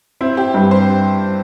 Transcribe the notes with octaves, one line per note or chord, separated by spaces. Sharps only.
C4 E4
G4
G2
C5